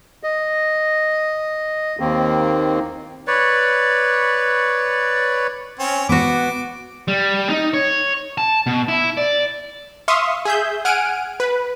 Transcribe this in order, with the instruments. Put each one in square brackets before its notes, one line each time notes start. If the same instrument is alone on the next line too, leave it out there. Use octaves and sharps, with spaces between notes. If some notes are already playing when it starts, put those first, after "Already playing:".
[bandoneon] D#5
D#2 D#3 A#3 C4
[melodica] B4 C#5 D5
[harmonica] C4 C#4
[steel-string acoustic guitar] B3 F#4 [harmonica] D6
[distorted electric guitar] G3
D#4
C#5
A5
B2
E4
D5
[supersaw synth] E5 F5 C6 C#6 D#6
G#4 E5 G6
F#5 G#5 F6 D7 D#7
B4